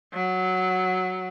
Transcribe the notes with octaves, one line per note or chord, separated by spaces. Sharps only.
F#3